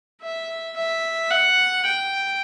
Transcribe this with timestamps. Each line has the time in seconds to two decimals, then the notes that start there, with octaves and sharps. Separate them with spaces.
0.22 E5
0.76 E5
1.31 F#5
1.86 G5